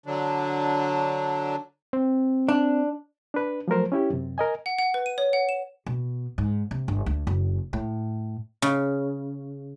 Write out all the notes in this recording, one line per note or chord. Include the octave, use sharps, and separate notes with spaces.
D3 F#3 D4
C4
D4
D4 B4
F3 F#3 A3 A#4 C5
C#4 E4 G4
F#2 C3
A#4 D#5 G#5
F#5
F#5
B4
D#7
C#5
F#5
E7
B2
G#2
C3
G1
D2
F#1
A2
C#3